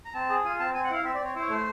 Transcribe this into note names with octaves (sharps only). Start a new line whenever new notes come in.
A#5
C4 A5
G#4
F4 G#5
C4 A5
C4 G#5
F#5
E4 F5
C4 E5
D5
C4 C#5
E4 C5
C#5
A3 C5